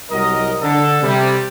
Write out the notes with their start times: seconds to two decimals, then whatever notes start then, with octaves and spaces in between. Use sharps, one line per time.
0.11 C2 F#3 A#4 D#5
0.62 D3 A4
1.03 C3 G3